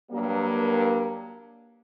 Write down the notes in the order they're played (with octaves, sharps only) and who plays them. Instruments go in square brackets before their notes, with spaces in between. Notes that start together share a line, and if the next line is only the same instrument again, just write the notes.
[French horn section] G2 F#3 G3 A#3